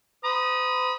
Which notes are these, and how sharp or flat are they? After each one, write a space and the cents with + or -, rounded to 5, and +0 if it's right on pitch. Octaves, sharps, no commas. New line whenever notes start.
C5 -45 B5 -45 D#6 +0